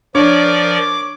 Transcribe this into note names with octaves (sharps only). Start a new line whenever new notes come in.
F3 D4 A#4 C#5 D5 D6